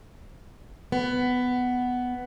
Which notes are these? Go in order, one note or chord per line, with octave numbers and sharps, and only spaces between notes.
B3